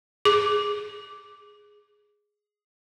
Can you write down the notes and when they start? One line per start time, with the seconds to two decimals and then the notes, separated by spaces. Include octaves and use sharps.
0.25 G#4 D6